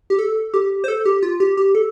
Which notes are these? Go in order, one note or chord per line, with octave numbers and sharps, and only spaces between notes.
G4
A4
G4
C5
A4
G4
F4
G4
G4
A4